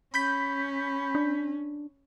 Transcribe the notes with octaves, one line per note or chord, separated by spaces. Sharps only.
C#4 B5 G6 B6
D4